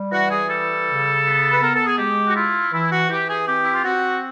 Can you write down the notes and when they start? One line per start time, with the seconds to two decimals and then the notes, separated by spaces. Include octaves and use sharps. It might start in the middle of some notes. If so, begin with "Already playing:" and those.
Already playing: G3
0.11 E3 F#4
0.29 G#4
0.48 G3 A4
0.86 C#3
1.23 B3
1.51 B4
1.61 B3 A#4
1.74 A4
1.86 G#4
1.98 G#3 G4
2.26 F#4
2.35 E4 F4
2.72 E3 E4
2.91 F#4
3.09 E3 G4
3.28 G#4
3.47 C4 G4
3.63 E4
3.73 F4
3.84 C4 F#4